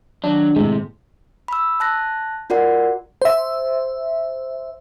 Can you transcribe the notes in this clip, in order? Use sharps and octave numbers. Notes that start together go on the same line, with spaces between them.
D#3 F#3 D4
A2 C3 G#3
B5 E6
A5 F#6 A#6
F4 F#4 A#4 D5 F#5
C5 E5